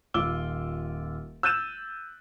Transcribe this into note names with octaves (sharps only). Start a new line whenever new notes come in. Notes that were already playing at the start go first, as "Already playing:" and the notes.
D#1 F4 D6 E6 G7
E6 F#6 G6 A6 D#7 E7